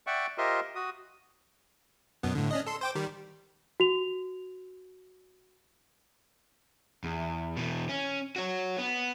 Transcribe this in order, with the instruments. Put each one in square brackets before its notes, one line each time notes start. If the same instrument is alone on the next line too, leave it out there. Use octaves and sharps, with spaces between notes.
[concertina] D5 E5 F#5 G5 C#6
F4 G4 A#4 C5 D#5 E5
F#4 D#6
[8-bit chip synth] F#2 B2 B3
A2 D3
C#4 D4 D#5
A4 C6
C5 G5 D6
D#3 G3
[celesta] F#4 F7
[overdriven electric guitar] E2
B2 E3
C#4
F#4 C#5
B3